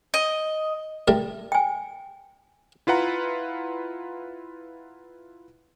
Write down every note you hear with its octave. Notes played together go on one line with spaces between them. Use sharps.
D#5
G3 A3 A#4
G5 G#5
E4 F4 B4 F#5 A#5